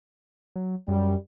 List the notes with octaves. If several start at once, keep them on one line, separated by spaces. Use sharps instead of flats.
F#3
F#2 G3